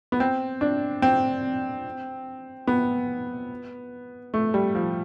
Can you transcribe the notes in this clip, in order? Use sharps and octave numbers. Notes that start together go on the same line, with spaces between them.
B3
C4
D4
C4
B3
A3
G3
F3